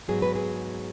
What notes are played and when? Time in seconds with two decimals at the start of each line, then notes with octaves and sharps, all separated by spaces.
0.08 G#2 F#3 B3 G#4
0.22 B4
0.35 G#4